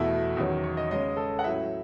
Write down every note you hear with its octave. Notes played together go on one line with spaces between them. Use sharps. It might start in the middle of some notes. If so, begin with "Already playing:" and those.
Already playing: E2 B2 A3 E4 E5
E2 D#3 F#3 C#4
C#5
D#5
C#3 G#3 C#4 D#5
A4
F#5
A2 F#3 C#4 E4 E5